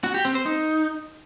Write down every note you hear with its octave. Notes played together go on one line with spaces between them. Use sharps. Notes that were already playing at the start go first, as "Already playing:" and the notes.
F#4
G4
C4
C5
D#4